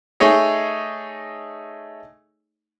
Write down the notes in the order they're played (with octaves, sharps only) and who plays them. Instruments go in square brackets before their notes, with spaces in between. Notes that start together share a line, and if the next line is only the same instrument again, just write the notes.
[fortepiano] A3 D#4 G#4 C#5 D#5